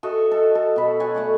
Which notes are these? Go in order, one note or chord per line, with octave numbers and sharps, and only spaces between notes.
F#4 A4 D#5 E5
A4
A4
B2 B5
C#5 F#5 G#5
A3 D5 C#6